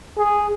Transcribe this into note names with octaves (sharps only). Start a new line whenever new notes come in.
G#4